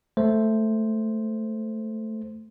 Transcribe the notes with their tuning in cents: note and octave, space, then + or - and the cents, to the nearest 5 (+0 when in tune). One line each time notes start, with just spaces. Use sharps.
A3 +0 C5 +0